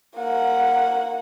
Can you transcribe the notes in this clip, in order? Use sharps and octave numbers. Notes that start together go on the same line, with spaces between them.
A#3 F#5